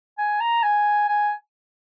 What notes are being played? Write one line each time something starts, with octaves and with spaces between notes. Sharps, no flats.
G#5
A#5
G#5
G#5